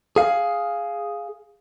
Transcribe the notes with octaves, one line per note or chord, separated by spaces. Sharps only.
G#4 F5